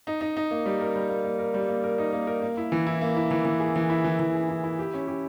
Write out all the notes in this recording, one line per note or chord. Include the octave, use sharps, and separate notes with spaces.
D#4
D#4
D#4
A#3
G3
A#4
G3
A#3
A#3
A#4
G3
A#3
A#4
D#4
A#3
A#4
A#3
E4
E3
E4
A#3
E4
E3
E3
G#4
E3
E4
E3
E3
G#4
E4
E4
G4
C#4
G4